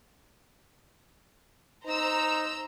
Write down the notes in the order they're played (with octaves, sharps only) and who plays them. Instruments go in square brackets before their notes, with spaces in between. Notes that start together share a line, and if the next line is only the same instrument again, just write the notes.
[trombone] D#4 [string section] C5 A#5 E6